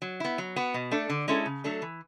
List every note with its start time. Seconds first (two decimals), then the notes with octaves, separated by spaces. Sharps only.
0.02 F#3
0.20 B3 E4
0.38 F#3
0.56 B3 F#4
0.74 B2
0.91 A3 D4 A4
1.09 D3
1.28 G#3 C#4 E4 A4
1.46 C#3
1.64 F#3 A3 D4 A4
1.82 E3